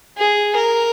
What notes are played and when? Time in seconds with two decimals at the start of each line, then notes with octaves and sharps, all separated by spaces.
0.18 G#4
0.56 A#4